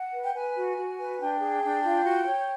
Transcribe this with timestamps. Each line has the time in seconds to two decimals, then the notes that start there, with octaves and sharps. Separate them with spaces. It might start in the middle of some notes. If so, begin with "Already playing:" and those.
Already playing: F#5
0.13 B4
0.24 G5
0.35 B4 G#5
0.56 F#4
0.76 F#4
0.99 B4
1.20 D4 G5
1.40 G#4
1.62 D4
1.83 F4
2.04 F#4
2.26 C#5